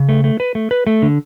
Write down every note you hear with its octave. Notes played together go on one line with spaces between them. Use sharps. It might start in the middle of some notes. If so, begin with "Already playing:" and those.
Already playing: C#3
A3
A3
B4
A3
B4
A3
D3